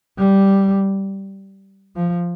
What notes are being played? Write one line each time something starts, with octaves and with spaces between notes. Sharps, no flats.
G3
F3